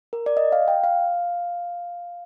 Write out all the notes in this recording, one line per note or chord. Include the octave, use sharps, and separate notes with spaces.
A#4
D5
D#5
F5
G5
F5